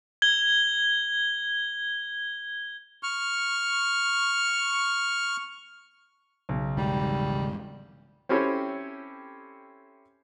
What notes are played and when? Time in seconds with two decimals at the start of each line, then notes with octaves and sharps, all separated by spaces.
0.22 G#6 G7
3.03 C#6 F6
6.49 B1 C#3
6.77 E1 G#2 D#3 G3
8.29 C4 C#4 E4 G4 A4 C#5